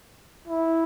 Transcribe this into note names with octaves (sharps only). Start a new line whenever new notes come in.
E4